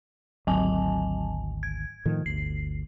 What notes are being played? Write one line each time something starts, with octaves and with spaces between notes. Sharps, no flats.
G#1 D2 F#3 G#5 A5
G#6
A2 D#3 F3
G1 D2 C7